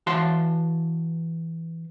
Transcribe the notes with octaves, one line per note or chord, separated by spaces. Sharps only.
E3 F#4 A5 C6